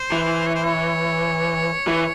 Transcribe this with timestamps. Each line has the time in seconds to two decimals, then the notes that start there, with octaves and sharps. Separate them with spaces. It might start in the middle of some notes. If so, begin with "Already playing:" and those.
Already playing: C5
0.12 E3
0.47 C#5
0.54 C5
0.64 C#5
1.87 E3